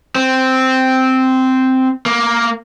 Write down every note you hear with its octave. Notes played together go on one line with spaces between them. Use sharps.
C4
A#3